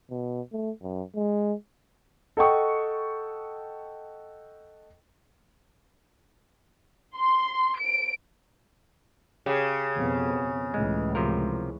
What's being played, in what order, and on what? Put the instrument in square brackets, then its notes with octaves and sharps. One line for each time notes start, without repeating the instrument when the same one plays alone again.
[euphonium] B2
A3
F#2
G#3
[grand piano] A4 D#5 F#5 G5 C#6 D#6
[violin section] C6
D7
[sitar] C#3 [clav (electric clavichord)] G4 G#4
[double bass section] F2 B2 B3
[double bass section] C#2 A2 E3 [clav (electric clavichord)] G#3
[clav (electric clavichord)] C3 F3 A#4